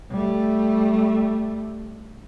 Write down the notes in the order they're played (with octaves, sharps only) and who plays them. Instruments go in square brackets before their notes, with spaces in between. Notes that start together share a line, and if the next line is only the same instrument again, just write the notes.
[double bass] G3 A3